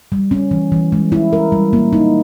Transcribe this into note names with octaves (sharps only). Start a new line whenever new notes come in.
G3
C#4
E3
E3
G#3
E4
A#4
G3
A#3
D#4